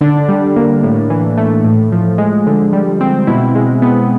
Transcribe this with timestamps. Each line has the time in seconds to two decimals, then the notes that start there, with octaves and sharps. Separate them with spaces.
0.01 D3 D4
0.29 G3
0.56 A#3
0.83 A2
1.10 E3
1.38 A3
1.64 A2
1.92 F3
2.18 G#3
2.46 D3
2.73 G3
3.01 C4
3.27 B2 E4
3.55 G#3
3.82 B3